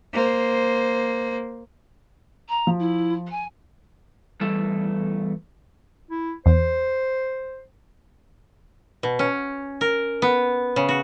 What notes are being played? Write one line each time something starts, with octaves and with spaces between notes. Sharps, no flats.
A#3 C5
A#5
F3
E4
G#5
E2 G3 A3 A4
E4
E2 C5
B2
C#4
A#4
B3
C#3
F#4